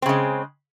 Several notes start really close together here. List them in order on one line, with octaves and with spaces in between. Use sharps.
C4 C#3 G#3